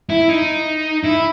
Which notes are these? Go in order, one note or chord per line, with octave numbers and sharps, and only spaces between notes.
E4
D#4
E4